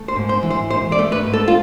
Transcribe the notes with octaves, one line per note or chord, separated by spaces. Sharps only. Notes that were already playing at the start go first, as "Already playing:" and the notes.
Already playing: A3
C5
G#2
C5
E3
C5
G#2 C5
D5
A3
B4
G#2
A4
F4